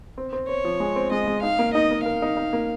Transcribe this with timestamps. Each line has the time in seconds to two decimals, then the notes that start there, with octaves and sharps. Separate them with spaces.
0.18 C4
0.33 C4
0.49 C4 C#5
0.65 F3
0.80 G#3
0.96 C4
1.11 G#3 D#5
1.27 G#3
1.43 D#4 F5
1.59 A#3
1.74 D#4 D#5
1.91 A#3
2.06 A#4 F5
2.22 D#4
2.37 D#4
2.53 A#3